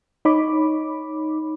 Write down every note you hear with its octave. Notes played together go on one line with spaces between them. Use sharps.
D#4 C#5 B5 D6